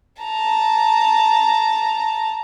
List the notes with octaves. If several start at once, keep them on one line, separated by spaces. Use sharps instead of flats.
A5 A#5